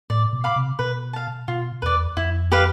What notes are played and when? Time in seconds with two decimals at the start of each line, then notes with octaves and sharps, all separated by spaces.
0.10 A2 D5
0.33 B2
0.44 F5 B5 D6
0.56 C3
0.79 B2 B4
1.13 F5 A5
1.48 B2 F4
1.82 E2 B4 D5
2.17 F2 E4
2.52 G4 B4 F5